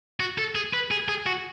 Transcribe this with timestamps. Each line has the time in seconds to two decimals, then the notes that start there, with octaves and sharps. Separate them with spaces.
0.20 F#4
0.38 A4
0.55 G#4
0.73 B4
0.91 G#4
1.08 G#4
1.26 F#4